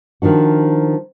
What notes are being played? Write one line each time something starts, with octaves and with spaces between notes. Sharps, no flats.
D#3 F3 D4 F#4